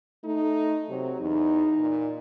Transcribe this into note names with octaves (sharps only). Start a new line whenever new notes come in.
A3 D#4
C3 F#3
E2 D#4
A#2